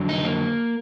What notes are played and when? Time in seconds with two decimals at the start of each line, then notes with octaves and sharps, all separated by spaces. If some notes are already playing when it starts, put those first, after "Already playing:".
Already playing: F2 D3 F#3
0.09 D#4
0.25 A#3